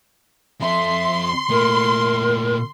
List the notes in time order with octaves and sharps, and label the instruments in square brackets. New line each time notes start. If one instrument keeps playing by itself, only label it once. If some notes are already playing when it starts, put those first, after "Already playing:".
[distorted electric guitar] F2 A4 [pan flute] E5 [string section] C6
[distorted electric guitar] A#2 A3 [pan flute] A#4